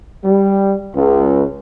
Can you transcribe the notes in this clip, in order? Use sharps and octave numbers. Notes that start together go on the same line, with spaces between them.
G3
C#2